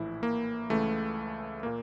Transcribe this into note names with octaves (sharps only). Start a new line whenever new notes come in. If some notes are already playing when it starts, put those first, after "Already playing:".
Already playing: A#1 A2 E3 E4
A#3
C#2 C#3 E3 A3
A#2 A#3